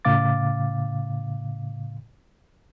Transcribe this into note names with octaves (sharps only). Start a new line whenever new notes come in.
A2 C#3 F5 D6 A6